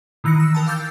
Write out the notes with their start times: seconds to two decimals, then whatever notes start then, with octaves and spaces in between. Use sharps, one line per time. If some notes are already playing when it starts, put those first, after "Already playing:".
0.24 D#3 E3 F#6 A#6 C#7
0.40 E6
0.54 A#4 G5 A5
0.66 F5 G5 D6 E6 G6 A6